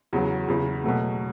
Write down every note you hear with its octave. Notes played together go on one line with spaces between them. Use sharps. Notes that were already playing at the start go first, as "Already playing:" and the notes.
E2 C#3 F#3
E2 C#3 E3
B2 F#3 A3